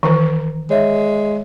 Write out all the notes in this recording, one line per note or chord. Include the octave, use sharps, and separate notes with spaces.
D#3 E3 A#4 A#5
G#3 C#5 E5